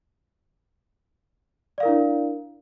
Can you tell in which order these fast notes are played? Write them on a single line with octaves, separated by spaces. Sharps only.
D5 F5 A#4 E4 D4